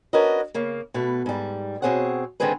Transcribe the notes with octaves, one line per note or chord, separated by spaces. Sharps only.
C#4 D4 F#4 A#4 B4 D#5
C#3 A#3
B2 A3 B4
G#2 G3
B2 C4 G#4 C#5 F#5
D3 D#3 G#3 C4 G#4 B4